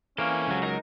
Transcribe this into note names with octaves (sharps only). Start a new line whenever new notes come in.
E3 A#3 C#4 A4 C5 F5
C#2 F#3
G#3 D#4 A#4